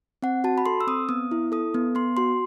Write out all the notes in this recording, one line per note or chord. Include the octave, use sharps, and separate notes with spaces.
C4 F#5
F#4 A5
B5
A4 C6
E6
C4 D#6
B3 D#6
E4
A4 D#6
B3
B3 C6
F#4 C6